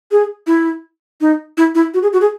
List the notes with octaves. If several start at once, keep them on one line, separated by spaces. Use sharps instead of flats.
G#4
E4
D#4
E4
E4
F#4
G#4
F#4
G#4